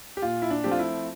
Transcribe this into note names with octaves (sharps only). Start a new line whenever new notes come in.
G4
A#2 F4
E4
D4
F3 A3 C4 G4
F4
E4